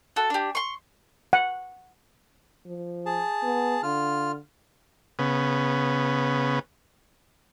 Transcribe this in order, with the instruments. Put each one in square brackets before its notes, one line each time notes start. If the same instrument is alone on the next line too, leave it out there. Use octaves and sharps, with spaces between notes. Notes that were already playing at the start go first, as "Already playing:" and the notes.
[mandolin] F#4 A4
D4 G4
C6 C#6
[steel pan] F#5
[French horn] F3
[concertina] G#4 A5
[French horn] B3
[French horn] D3 [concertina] F4 F6
[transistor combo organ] C#3 B3